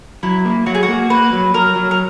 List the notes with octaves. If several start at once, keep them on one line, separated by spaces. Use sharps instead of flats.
F#3 E4
A#3
F#3 F#4
G#4
F#4
A#3
A#3 B4
F#3
F#3 A#4
F#3
A#4